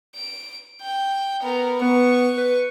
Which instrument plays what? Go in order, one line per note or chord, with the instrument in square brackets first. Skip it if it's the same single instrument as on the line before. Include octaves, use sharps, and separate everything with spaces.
[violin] D7
G5
B3 A#4
[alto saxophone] B3 [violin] C#6
[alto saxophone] B4